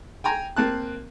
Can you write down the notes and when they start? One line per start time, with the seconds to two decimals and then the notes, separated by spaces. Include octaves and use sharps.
0.24 G5 G#5 A#5
0.57 A#3 C4 A5 F#6